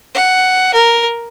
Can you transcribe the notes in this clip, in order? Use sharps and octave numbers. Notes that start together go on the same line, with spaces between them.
F#5
A#4